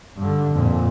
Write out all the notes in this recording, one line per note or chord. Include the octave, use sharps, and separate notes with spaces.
G2 D3
F2 A#2